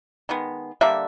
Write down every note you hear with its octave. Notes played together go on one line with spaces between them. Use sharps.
D#3 G#3 B3
D3 G3 A#3 E5